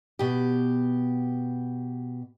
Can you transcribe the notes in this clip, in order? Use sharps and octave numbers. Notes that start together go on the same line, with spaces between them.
B2 G4